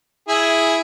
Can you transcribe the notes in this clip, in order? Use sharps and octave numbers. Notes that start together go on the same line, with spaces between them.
E4 G#4